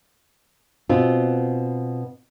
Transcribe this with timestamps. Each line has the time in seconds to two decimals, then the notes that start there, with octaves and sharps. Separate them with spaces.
0.89 B2 B3 C4 F4